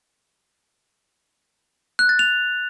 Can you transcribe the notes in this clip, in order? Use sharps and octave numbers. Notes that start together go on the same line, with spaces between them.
F#6
A6
F7